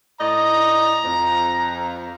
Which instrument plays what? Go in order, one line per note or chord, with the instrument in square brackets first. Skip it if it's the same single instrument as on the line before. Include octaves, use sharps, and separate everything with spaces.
[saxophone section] A2 D5 D#5 [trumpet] A#5
[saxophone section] F2